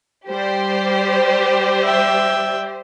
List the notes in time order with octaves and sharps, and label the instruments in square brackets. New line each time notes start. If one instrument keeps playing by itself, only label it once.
[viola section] G3 D5 [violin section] G4 C5
[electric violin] E5 G5